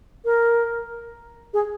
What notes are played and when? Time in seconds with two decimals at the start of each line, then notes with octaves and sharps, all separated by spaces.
0.25 A#4
1.54 G#4